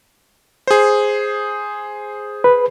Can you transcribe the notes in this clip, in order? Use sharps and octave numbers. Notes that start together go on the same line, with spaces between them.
G#4 C5
B4